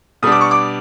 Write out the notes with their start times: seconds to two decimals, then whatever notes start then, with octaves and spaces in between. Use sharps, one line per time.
0.22 B2 G3 B3 D4 D#6
0.32 D6
0.41 C#6
0.51 D6